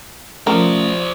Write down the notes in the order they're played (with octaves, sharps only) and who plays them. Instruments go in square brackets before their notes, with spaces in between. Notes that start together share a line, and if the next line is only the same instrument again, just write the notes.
[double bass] F3 [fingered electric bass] A3 C#4 [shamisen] A#4 [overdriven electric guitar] C5 D5